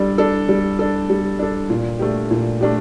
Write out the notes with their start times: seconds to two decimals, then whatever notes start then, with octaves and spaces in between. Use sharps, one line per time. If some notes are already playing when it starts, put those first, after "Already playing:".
Already playing: G3 D4 A4
0.18 D4 A4
0.49 G3
0.79 D4 A4
1.10 G3
1.39 D4 A4
1.70 A#2
1.99 A3 D4 G4
2.31 A#2
2.61 A3 D4 G4